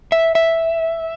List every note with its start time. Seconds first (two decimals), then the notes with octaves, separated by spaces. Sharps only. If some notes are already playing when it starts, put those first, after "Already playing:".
0.12 E5
0.35 E5